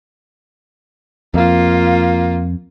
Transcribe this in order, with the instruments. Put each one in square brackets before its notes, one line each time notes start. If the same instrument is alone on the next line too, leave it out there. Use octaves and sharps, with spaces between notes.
[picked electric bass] F2 [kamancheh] A#3 F4